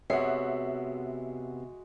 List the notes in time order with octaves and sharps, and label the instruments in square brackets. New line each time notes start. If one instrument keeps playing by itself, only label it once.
[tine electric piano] C3 B3 C7 [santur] G#3 F#4 [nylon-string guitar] C#5 [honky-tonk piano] E5 F#5